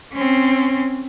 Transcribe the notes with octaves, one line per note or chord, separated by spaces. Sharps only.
C4 C#4